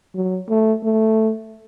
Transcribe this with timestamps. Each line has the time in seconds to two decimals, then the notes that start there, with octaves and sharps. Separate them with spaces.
0.15 F#3
0.49 A3
0.83 A3